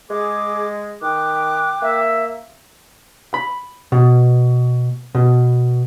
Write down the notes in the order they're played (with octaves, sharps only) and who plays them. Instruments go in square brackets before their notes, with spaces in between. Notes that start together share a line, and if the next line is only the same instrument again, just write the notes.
[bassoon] G#3 [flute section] G#4 D6
[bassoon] D#3 [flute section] G5 D6 F#6
[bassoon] A#3 [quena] E5
[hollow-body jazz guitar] B5
B2
B2